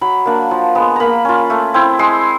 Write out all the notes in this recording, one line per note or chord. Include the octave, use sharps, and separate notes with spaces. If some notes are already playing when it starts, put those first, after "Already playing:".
F#3 B5
A#3 D4
F3
G#3 B3
A#3 A#5 B5
C#4 F4
A3
C4 E4
G#3 C6